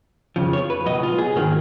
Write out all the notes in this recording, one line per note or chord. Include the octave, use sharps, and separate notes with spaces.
F2 C#3 F3
C#5
B4
C#2 B2 F#3 D#5
F4
G#4
G#2 D#3 F#3 A#3